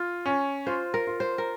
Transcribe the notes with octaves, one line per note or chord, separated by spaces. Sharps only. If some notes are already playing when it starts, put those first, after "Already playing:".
Already playing: F4
C#4
F4 C5
A#4
F4
C5
A#4